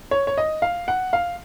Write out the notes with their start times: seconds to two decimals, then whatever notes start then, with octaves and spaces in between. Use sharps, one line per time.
0.11 C#5
0.27 C#5
0.37 D#5
0.62 F5
0.88 F#5
1.13 F5